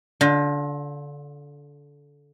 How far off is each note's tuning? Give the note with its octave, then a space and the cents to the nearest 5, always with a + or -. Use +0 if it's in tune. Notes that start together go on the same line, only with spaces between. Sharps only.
D3 -20 F4 +25